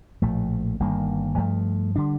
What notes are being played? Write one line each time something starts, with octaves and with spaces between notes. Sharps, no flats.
A#1 A2 F3 A3
G1 G2 D#3 A#3
G2 F3 A3
D3 G3 D4